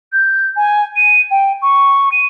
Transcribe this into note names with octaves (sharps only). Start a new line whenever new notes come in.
G6
G#5
D#7
G5
C#6
D#7